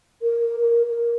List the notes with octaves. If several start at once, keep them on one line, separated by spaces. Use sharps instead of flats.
A#4
A#4
A#4